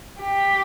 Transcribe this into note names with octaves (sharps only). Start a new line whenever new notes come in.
G4